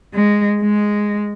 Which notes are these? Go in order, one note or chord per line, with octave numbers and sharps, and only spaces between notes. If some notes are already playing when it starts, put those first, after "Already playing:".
G#3
G#3